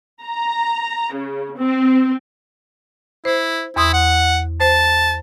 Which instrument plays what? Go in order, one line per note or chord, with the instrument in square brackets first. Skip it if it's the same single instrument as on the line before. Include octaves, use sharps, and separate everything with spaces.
[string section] A#5
C#3
C4
[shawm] E4 [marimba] C5
[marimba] E2 C6 D#6 [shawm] E4
[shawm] F#5
[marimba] C5 [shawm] A5